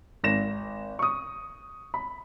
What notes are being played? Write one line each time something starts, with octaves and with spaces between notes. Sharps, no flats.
G#1 A#6 E7
C#6 D#6
B5